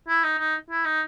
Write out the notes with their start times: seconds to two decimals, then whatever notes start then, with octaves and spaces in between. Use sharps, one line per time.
0.08 E4
0.24 D#4
0.39 D#4
0.70 E4
0.85 D#4